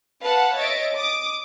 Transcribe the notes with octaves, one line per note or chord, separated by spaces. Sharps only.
B4 F5 F#5 A5
C#5 D#5 E5 A6 D7
D6 D#6